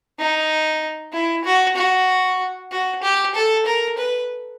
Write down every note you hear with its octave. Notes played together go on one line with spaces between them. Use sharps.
D#4
E4
F#4
F#4
F#4
G4
A4
A#4
B4